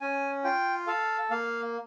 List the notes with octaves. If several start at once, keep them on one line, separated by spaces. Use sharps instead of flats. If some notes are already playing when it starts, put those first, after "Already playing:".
C#4 G#5
F4 G5
A4 F5
A#3 F5